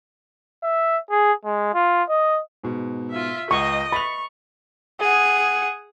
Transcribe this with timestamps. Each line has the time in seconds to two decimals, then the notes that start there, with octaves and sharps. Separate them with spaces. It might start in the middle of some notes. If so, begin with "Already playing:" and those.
0.63 E5
1.11 G#4
1.45 G#3
1.74 F4
2.09 D#5
2.63 G#2 B2
3.11 F4 E5
3.51 C#2 D#5 G5 C#6
3.93 B5 C#6 A6 F7
5.00 G#4 F#5